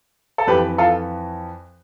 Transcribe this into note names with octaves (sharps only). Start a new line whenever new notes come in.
A4
F2 E3 G4 B4
F4 A4